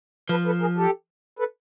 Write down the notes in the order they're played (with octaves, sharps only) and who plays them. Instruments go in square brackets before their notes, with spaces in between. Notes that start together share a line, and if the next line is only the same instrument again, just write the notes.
[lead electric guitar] F3 [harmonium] A4 B4
[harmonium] A4 B4
G#4 A#4
G4 A4
A4 B4